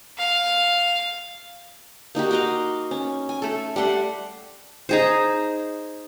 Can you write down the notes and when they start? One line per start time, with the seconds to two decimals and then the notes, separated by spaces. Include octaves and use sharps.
0.18 F5
2.15 A#3 D#4 F#4 G4
2.31 F#4 D#5 F5
2.91 C#4
3.29 G#5
3.42 A3 A4
3.76 G3 A3 F#5 C6
4.89 D#4 G#4 C5